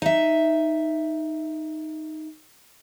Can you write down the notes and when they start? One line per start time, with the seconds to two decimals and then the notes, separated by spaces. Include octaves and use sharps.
0.02 D#4 E5